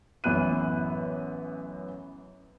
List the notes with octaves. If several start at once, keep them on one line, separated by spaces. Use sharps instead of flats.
A1 F#2 E3 B3 F#6 D#7